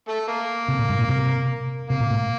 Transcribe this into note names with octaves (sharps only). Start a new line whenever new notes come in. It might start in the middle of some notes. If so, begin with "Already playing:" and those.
A3 A4
A#3 A#4
C3
A#2
G2
A#2
C3
C3 A#3
A#2
A2